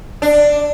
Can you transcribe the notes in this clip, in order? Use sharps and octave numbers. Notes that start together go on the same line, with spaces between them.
D4